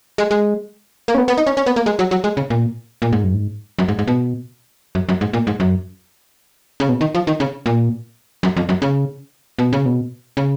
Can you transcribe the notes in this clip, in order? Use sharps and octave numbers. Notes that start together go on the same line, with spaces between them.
G#3
G#3
A#3
C#4
B3
B3
D#4
C#4
C#4
B3
A#3
G#3
F#3
F#3
G#3
C#3
A#2
A#2
G#2
F#2
G#2
F#2
G#2
G#2
B2
F#2
F#2
G#2
A#2
G#2
F#2
C#3
B2
D#3
F3
D#3
C#3
A#2
F#2
F2
F#2
C#3
B2
C#3
B2
C#3